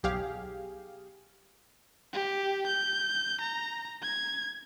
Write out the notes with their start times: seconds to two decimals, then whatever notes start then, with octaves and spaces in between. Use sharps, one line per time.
0.03 B1 G4 G#4 F5
2.14 G4
2.67 G6
3.41 A#5
4.03 G#6